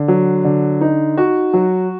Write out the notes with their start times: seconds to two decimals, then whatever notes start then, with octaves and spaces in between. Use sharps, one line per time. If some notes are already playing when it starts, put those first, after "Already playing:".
Already playing: D3
0.08 F#3
0.44 D3
0.81 D#4
1.17 F#4
1.53 F#3